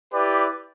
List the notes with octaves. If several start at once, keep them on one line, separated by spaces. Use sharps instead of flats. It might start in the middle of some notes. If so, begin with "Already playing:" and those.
E4 G4 B4 D5